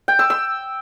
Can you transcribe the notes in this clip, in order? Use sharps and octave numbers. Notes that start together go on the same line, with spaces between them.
G5
E6
E6